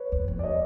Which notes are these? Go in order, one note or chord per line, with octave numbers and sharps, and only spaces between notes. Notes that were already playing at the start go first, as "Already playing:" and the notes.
Already playing: B4 C#5
E2
F2
D5
C#5 D#5